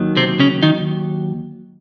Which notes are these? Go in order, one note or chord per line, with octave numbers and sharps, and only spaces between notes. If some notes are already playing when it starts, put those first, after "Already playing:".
Already playing: D#2 D#3 F#3
C3 C4
C#3 C#4
D#3 D#4